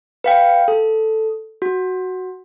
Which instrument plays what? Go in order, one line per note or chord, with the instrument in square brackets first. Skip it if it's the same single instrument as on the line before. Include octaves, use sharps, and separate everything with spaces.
[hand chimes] B4 F5 G5
A4
F#4